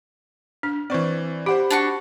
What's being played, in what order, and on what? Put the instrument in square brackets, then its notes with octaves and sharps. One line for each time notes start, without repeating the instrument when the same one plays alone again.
[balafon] D4 [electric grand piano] F6
[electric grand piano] E3 C5 D5 [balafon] C4 C#6
[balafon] G4 [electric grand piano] C5 F#5 B5
[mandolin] D4 F#4 C#6